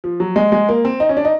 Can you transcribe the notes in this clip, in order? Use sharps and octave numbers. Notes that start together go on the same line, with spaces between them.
F3
F#3
G#3
G#3
A#3
C4
D#4
C#4
D4
D#4